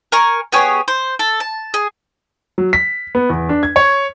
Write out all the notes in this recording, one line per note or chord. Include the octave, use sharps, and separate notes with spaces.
A#4 G#5 C#6
B3 G4 G#4 C#5
C5
A4
A5
G#4
F#3
B6
B3
E2
D4
G#6
C#5